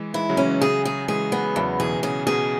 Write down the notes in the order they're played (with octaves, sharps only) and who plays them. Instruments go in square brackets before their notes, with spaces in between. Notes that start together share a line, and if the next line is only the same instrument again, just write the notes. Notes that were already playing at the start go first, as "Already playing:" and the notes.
Already playing: [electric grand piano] E3 G#3
[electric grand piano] E3 G#3 [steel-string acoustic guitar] E4
[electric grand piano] C#3 F#3
[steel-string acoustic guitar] C#4
[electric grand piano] E3 G#3
[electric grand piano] C#3 F#3 [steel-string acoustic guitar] G#4
[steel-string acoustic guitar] G#4
[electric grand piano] E3 G#3 [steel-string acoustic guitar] G#4
[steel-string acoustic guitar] B3
[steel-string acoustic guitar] E2 [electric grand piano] C#3 F#3
[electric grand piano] B2 E3 [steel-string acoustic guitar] G#4
[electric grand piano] C#3 [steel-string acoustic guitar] G#4
[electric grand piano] B2 [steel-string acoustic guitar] G#4